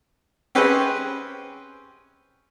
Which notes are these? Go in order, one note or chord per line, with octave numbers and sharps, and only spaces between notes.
C4 C#4 G4 G#4 B4